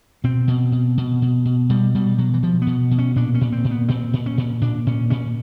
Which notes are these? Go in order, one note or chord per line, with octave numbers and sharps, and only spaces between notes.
B2 C4
B2
B2
B2
B2
B2
B2 G3
B2 G3
B2 F#3
E3
B2 F3
B3
B2
B2
C#4
A#2 D4
C#4
A#2
C4
A#2
B3
A#2 C4
A#2
C#4
A#2
A#2 D4
A#2 C#4
A#2 C#4